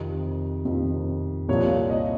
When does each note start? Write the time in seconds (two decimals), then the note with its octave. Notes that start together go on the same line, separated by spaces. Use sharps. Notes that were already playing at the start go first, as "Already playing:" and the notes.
Already playing: F2 C3 D#3
0.65 F2 C3 D#3
1.49 C2 A#2 F3 C#5
1.90 D#5